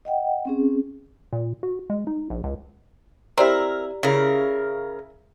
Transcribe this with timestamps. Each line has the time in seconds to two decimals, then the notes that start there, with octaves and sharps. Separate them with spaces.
0.05 D#5 F#5 G5
0.45 C4 C#4 G#4
1.33 A#2
1.63 F#4
1.90 G#3
2.07 D#4
2.30 A#1
2.44 C#2
3.38 C4 E4 G4 A#4 D5 A#5
4.03 C#3 E4 A#4